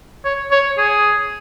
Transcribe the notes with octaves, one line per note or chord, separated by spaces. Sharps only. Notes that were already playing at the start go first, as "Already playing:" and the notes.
C#5
C#5
G#4